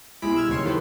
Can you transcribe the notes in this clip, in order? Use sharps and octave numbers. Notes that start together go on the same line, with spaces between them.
B1 G3 G#3 E4 B5 D7
E6 F6 G#6
D#2 C#3 F#3 C#5 C6
D#3 E4 G4 A4 B4 C5